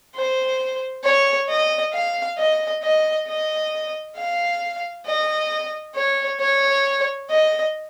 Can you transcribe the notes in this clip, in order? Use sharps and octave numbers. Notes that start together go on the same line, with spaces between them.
C5
C#5
D#5
F5
D#5
D#5
D#5
F5
D#5
C#5
C#5
D#5